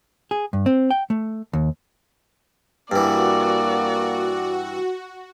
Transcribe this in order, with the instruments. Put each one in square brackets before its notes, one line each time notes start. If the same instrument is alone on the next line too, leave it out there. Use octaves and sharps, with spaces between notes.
[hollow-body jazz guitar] G#4
G2
C4
G5
A3
D#2
[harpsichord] G2 E3 [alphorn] A#3 [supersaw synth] F#4 [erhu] D5